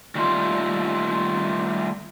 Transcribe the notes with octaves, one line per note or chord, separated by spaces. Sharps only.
D#3 G3 A3 F4